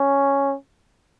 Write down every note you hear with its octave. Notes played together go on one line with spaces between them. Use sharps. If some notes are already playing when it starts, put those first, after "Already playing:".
Already playing: C#4